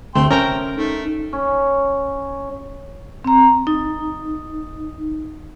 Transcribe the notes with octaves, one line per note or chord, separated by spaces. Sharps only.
D2 C3 A3 G5 C6
C4 C#4 A#4 G5 A#5
A3 D#4
C#4
C4 A#5
D#4